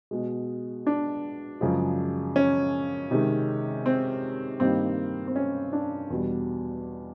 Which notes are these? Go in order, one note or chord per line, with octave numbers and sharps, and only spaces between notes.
B2 G#3
D4
F#2 C#3 F3 G#3
C#4
C3 D#3 G#3
C4
G2 D#3 G3 A#3 C4
C4
C#4
D4
E2 B2 G3